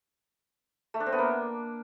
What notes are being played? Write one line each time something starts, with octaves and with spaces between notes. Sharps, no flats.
A3
D4
C4
B3
A#3